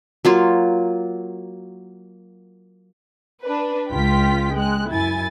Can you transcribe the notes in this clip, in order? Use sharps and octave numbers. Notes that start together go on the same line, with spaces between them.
F#3 A#3 F4
D4 B4
C#2 F4 G5 B6
G#3 F#6
F#2 E4 G#5 A6